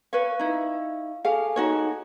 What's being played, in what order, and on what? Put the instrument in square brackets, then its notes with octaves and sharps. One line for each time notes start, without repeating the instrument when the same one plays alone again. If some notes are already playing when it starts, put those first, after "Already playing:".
[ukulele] B4 C#5 [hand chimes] F5 C#6
[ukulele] D#4 E4
[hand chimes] G#4 A4 G#5 [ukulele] F5
[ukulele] D#4 F#4 C#5